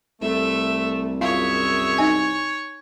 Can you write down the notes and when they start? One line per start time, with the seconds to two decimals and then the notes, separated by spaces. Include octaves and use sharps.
0.21 C2 A3 E5
1.21 F#2 F4 G#4 C#5 E5
1.98 D#4 G#5